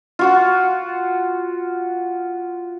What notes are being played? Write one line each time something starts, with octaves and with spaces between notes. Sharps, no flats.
F4 F#4 F#5